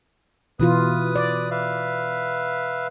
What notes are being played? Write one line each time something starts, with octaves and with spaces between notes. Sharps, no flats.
B2 E3 F4 B4 D#6
D5
B4 E5 F5